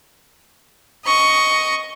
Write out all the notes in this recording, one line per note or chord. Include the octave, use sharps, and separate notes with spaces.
D#5 C#6